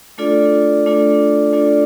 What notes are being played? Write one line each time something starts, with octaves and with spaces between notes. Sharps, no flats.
A3 D4 F4 A4 D5
A3 D4 F4 A4 D5
A3 D4 F4 A4 D5